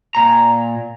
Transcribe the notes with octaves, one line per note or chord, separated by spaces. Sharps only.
A#2 A#5